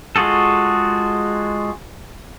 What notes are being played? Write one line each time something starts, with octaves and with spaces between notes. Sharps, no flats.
G#3 F4 F#4 G#4 A4